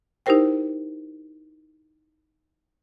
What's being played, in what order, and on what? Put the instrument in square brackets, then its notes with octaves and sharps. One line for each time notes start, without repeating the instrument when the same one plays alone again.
[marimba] D#4 E4 G4 A#4 C5 G5